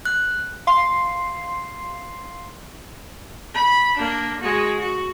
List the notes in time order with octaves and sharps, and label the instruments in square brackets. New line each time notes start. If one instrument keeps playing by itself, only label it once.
[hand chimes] F#6
[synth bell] F5 C6 C7
[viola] B5
A#3 D4
G#3 F#4
F#4